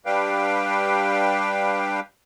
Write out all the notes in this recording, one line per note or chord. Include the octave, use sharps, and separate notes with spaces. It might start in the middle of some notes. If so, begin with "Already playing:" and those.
G3 D4 G4 B4 F5 G5